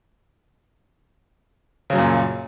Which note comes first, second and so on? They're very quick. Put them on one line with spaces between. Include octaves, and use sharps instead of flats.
C#3 F#3 F#2 A#2